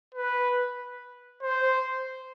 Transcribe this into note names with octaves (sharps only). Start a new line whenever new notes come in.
B4
C5